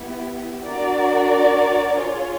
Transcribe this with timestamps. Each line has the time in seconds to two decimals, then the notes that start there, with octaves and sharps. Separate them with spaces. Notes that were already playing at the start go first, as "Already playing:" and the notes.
Already playing: B3 E4 G4
0.63 D4 F#4 A#4 D5
1.96 F4 G#4 C#5